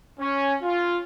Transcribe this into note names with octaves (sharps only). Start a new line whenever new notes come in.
C#4
F4